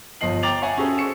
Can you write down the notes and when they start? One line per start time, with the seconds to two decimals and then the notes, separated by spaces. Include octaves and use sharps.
0.21 G1 F3 D#5 C7 F#7
0.43 G5 A#5 D6 A6 F7 F#7
0.62 C#5 E5 F#5 G#5
0.78 C#4 F#4 G#4 A4 C5
0.98 C#6 E6 C#7 E7